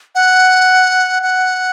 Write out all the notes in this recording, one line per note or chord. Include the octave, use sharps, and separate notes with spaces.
F#5
F#5